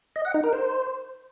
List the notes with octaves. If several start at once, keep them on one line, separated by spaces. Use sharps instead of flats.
D#5
F#5
D#4
A#4
C5